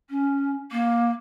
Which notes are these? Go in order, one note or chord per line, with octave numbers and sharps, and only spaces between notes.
C#4
A#3